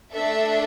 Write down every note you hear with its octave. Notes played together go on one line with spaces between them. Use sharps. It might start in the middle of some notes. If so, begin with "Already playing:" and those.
A3 D4 A4 E5